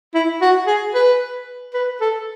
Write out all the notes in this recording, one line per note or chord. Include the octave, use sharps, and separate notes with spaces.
E4
F#4
G#4
B4
B4
A4